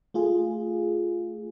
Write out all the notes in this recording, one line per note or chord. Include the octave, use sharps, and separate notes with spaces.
A3 F4 G#4